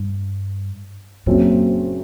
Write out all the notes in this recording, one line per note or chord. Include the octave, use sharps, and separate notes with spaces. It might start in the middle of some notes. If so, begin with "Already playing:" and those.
Already playing: G2
F#1 F#2 A#2 F#3 C4